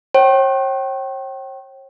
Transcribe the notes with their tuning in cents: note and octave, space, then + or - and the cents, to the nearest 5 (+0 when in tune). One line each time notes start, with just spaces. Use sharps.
C#5 -45 G5 -30